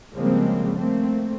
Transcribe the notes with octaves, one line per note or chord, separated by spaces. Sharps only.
C#3 F3 G3 G#3 A#3 C4
A3 A#3 C4